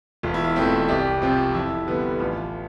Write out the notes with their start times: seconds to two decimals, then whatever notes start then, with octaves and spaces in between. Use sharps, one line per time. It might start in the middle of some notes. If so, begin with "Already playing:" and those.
0.23 E1 F4
0.34 E4
0.44 F4
0.56 E2 B2 A3 C4
0.89 C2 G4
1.22 C3 F3 C4
1.54 F2 E4
1.87 D3 G3 B3
2.20 A1 F4